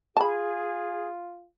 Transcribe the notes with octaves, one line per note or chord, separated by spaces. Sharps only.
F4 G#4 A5 B5